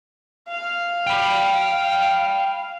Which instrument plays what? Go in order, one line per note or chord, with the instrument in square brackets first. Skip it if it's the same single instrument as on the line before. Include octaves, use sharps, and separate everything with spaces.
[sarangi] F5
[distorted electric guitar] G5 B5